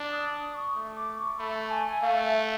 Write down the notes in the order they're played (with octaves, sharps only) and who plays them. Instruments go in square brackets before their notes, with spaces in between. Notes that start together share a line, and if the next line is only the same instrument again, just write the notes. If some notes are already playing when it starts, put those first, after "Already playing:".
Already playing: [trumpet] D4
[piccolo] D#6
D#6
C#6
[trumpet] A3
[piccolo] D6
C#6
[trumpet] A3 [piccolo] B5
[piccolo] A5
G#5
G#5
[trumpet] A3 [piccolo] F5
[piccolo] E5